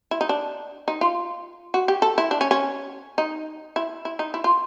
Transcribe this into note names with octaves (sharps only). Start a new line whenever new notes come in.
E4
D#4
D4
D#4
F4
F#4
G4
A4
E4
D4
C#4
C#4
D#4
E4
E4
D#4
E4
F4